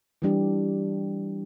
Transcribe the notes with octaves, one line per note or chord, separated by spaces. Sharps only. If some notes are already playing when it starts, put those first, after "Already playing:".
E3 G3 D4 G4